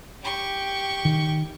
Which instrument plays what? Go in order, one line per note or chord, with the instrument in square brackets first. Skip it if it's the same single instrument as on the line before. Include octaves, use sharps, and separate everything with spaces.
[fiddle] G4 C#6
[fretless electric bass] D#3